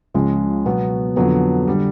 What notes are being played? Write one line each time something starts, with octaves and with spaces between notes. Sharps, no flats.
C#2 C#3 F3 G#3
B2 F#3 B3
F2 D3 F#3 B3
D3 G3